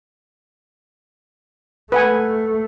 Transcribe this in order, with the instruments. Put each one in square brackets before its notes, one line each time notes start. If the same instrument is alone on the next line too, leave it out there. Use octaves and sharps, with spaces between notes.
[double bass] A3 [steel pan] B4 F#5 G#5